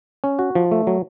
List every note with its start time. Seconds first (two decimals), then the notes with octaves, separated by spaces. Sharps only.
0.24 C#4
0.39 F#4
0.55 F3
0.71 A3
0.87 F#3